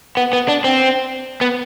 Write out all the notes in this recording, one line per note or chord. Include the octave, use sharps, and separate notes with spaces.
B3
B3
D4
C4
B3